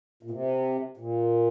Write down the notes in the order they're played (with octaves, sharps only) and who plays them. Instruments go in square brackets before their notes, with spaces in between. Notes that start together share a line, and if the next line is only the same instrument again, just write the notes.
[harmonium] A#2
C3
A#2